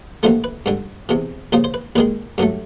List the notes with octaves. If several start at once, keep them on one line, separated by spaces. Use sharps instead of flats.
D#2 D3 F3 A3 C5
B4
G2 D3 G3
E2 C3 E3
D#2 C#3 F3 C5
C5
B4
D#2 D#3 G#3 B4
G2 D3 F#3 A3